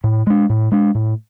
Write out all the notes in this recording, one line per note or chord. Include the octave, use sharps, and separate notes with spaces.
A2
G#3 D4
A2
G#3 D4
A2